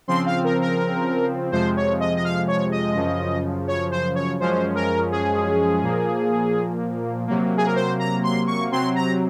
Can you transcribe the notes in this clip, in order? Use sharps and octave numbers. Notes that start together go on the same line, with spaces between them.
C#3 F3 C4 C6
F5
A#4
A#4
F2 C3 F3 G#3 C5
C#5
D#5
D#5
F5
C#5
D#5
F#2 C#3 F3
C#5
C5
C#5
F#2 F3 G#3 C#4 C5
A#4
G#4
A#2 F3 A#3
C3 F#3 A#3
G#4
A#4
C5
A#5
C6
C#6
C3 F#3 C4 C6
A#5